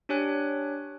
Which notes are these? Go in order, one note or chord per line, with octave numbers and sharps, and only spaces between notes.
D4 G4 C#5 G#5 F#6